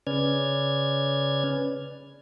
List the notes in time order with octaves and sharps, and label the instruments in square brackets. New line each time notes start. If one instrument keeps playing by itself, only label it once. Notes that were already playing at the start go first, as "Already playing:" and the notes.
[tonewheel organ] C#3 C#4 B4 D5 F6 G#6